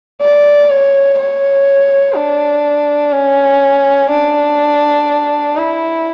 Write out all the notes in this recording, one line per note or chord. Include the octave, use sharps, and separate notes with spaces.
D5
C#5
C#5
D4
C#4
D4
E4